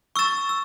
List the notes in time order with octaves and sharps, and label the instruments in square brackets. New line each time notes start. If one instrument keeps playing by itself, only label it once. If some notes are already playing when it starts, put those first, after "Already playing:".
[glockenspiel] C#6 E6 A6 E7
E6